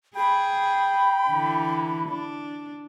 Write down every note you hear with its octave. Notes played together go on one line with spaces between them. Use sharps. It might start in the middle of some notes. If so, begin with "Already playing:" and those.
G#4 G5 B5
D3 E3
D4